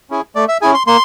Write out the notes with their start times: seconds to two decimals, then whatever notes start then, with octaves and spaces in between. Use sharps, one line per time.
0.10 C#4 E4 G#4
0.35 A3 D5
0.48 E5
0.61 C#4 E4 G#4 G#5
0.74 C6
0.87 A#3 C6